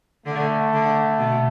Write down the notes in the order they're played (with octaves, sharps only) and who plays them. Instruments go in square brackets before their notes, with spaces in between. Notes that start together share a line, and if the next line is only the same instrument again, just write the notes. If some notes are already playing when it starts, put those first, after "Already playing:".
[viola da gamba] D3 [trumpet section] A3
[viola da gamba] D3
B2